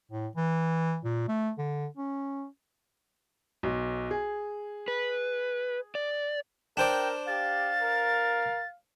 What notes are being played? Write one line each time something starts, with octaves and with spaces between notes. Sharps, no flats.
A2
E3
A#2
A3
D3
C#4
B1
G#4
B4
D5
D4 A#4 C5 D5 G5
G4 F5 A6
A#4